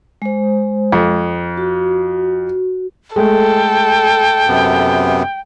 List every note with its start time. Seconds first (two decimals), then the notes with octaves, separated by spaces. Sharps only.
0.22 G#3 C5
0.92 F2
1.57 F#4
3.16 G#3 A3 A4 G5
4.48 F#2 C3 B3